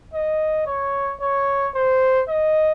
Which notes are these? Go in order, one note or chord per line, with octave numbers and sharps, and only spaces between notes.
D#5
C#5
C#5
C5
D#5